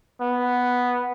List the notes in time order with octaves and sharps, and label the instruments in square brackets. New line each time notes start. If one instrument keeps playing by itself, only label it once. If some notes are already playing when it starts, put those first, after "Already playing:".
[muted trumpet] B3